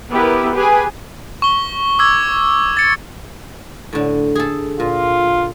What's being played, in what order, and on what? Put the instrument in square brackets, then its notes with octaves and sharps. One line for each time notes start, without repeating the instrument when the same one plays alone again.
[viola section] B3 E4 G4 A#4 B4
G4 G#4 B4 G#5
[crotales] C#6 G7
D6 E6 G#6
A6 C#7
[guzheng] A2 D3
G#4 A4
[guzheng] A#2 [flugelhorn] F4